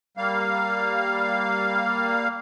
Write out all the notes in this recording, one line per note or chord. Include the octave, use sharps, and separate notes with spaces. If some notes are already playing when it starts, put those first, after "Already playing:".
G3 A#3 F5